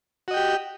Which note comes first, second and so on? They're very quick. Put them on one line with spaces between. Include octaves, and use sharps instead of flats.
F#4 D#5 G5 G4